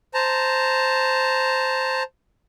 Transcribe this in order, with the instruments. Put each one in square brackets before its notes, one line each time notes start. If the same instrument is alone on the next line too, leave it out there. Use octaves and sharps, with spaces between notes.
[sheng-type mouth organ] C5 A5 A#5